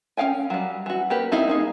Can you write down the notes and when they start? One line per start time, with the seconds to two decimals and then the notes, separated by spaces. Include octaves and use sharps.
0.17 C#4 A4 F5 G5 G#5
0.50 F#3 G3
0.86 E3 F#4
1.10 A#3 G4 B4
1.32 C4 D#4 E4 F5
1.48 A#3 D#4 G#4